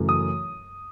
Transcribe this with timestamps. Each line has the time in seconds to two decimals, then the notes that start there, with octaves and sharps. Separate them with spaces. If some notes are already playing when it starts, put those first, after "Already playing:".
Already playing: F#2 C#3 E3 A3
0.09 D#6